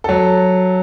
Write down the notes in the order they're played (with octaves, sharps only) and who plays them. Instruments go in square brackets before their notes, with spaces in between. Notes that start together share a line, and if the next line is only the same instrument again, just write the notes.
[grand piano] F#3 A4